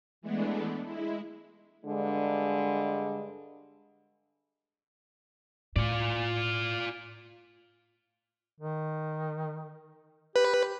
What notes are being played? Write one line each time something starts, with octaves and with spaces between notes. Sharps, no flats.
E3 G#3 A3 B3 D4
G#3 E4
G2 D3 G#3
A2 F4 D5
D#3
G4 B4